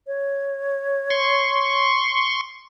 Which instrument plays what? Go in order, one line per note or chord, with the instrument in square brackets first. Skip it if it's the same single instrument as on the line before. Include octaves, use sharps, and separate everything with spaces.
[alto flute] C#5
[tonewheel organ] C6 C#6